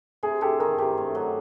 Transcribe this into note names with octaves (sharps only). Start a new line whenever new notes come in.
C3 G#4
C3 G4 A4
D#3 G#4 A#4
C3 G4 A4
A3
F#3